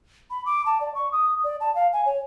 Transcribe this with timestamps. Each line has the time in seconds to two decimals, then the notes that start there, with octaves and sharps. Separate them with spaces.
0.30 B5
0.46 D6
0.66 A5
0.81 D5
0.95 C#6
1.12 D#6
1.44 D5
1.60 A5
1.75 F5
1.93 G#5
2.06 C#5